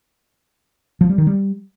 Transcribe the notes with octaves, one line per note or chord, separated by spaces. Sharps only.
F3
G3
D#3
G3